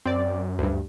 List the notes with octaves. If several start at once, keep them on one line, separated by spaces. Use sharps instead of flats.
F#2 C4 D5
D2 G2